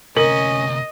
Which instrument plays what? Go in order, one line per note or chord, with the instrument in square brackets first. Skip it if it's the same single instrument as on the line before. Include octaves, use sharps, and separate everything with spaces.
[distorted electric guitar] D2 C3 [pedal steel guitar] C#4 [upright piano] A#4 F#7 [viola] D#5